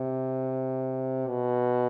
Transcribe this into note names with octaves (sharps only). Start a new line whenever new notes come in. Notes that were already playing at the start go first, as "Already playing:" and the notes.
Already playing: C3
B2